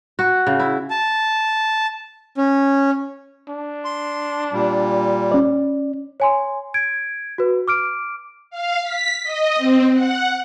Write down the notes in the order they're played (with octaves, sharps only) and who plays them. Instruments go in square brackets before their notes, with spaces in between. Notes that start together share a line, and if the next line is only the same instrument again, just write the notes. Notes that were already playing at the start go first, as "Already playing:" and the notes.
[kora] F#4
C#3
E4
[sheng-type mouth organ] A5
C#4
[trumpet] D4
[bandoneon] C6
A#2 G3
[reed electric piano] C#4 D5
[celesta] C#5 G#5 C6
G#6 D7
F#4 B4
D6 F6 D7
[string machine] F5
B6
D#5
C4
F#5